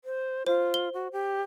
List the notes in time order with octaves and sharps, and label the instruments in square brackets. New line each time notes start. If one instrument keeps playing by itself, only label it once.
[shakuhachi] C5
[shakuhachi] F4 [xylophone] C5
[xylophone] G7
[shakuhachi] F#4
G4